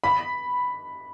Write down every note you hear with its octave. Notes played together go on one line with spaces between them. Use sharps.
B5